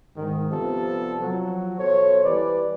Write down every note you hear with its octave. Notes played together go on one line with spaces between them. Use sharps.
G#2 D#3
C3 F3 G3 B3 A4
F3 F#3
B2 A4 C5 C#5
E3 G3 B4 D5